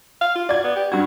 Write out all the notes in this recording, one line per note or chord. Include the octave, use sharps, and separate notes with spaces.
F5
F4
F#4 D5 G#6
B3
G4
G2 F#4 G#6